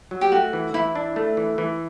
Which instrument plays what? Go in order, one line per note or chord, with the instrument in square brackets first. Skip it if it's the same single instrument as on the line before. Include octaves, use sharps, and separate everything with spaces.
[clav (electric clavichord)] F#3
[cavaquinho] G4
[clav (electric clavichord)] A3 [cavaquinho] F#4
[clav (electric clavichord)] E3
[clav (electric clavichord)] E3 [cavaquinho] E4
[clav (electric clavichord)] D4
A3
E3
E3